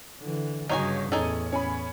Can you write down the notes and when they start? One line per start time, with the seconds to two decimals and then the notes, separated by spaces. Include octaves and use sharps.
0.20 D3 E3
0.69 G1 G2 C#3 F#3 D#4 C#5 G#5
1.12 E2 A2 C#4 D#4 G#4 A4
1.52 C#4 G#5 B5